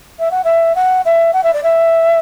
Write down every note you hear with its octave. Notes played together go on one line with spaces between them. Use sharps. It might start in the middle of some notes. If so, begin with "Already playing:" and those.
E5
F#5
E5
F#5
E5
F#5
E5
D5
E5